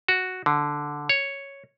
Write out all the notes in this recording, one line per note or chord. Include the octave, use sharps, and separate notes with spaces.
F#4
D3
C#5